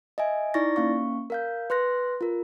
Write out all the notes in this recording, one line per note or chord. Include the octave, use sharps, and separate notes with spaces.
D#5 E5 G#5
D#4 E4 D5 C#6 A6 A#6
A#3 C#4 F5 C#6
A#4 F5 G6
B4 C6 F#6 A#6
F4 A#4